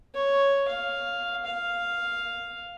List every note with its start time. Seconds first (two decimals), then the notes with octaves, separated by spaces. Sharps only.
0.14 C#5
0.68 F5
1.45 F5